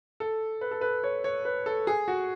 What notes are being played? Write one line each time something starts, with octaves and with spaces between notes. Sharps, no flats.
A4
B4
A4
B4
C#5
C#5
B4
A4
G#4
F#4